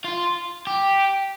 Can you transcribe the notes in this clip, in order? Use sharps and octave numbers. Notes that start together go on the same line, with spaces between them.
F4
G4